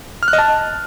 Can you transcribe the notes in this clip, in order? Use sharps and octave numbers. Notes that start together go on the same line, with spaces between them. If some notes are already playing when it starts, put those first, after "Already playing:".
F6
F#6
D#5
A5